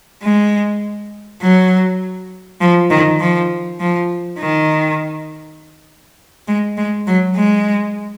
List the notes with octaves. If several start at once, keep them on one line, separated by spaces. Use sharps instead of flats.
G#3
F#3
F3
D#3
F3
F3
D#3
G#3
G#3
F#3
G#3